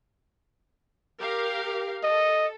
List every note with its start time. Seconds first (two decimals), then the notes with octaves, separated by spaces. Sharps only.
1.20 G4 A#4 F5
2.03 A4 D#5